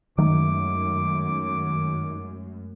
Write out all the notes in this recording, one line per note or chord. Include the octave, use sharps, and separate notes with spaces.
F#2 D#3 F#3 G#3 A3 D6